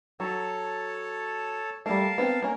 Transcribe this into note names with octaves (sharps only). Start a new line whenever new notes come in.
F#3 A4 C#5 A5
G3 A3 A#4 F5 A5
B3 C4
A#3 C#4 A#4